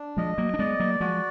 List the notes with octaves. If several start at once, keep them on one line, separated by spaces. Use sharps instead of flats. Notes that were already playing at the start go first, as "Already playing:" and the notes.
Already playing: D4
F3 G#3 D#5
F#3 A#3
D4
G#3 B3 D5
F#3 A#3
F3 G#3 F#4